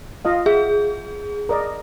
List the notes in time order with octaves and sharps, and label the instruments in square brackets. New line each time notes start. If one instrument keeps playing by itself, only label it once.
[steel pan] F4 D#5 F5
[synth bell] G#4 [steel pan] E5
[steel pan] A#4 D5 D#5